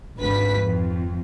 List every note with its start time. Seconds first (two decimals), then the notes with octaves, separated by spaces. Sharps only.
0.17 G#1 D2 B4 B6
0.58 F2